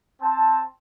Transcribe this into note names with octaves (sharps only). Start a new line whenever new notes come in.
C4 A5